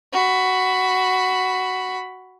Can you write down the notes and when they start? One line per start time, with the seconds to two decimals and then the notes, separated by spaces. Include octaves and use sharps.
0.13 F#4 B5